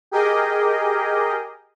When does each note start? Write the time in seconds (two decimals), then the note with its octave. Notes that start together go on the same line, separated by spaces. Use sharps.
0.12 G4 G#4 A#4 D#5